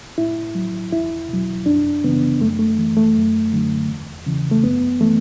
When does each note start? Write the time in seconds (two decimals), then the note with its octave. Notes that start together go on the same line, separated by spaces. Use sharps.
0.18 A2 E4
0.55 F#3
0.93 E2 E4
1.29 B2 F#3
1.66 F#2 D4
2.04 C#3 E3 B3
2.40 F#2 A3
2.59 A3
2.78 E3
2.97 A3
3.16 F#2
3.52 D3 F#3
3.89 E2
4.26 C#3 E3
4.51 A3
4.64 F#2 B3
5.01 E3 A3